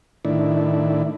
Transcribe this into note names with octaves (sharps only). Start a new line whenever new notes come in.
A2 D#3 D4 E4